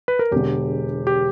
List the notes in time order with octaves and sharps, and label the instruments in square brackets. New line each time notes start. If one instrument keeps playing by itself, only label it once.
[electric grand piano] B4
A#4
[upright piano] E1 E2 D3 [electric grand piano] G4
[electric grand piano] G4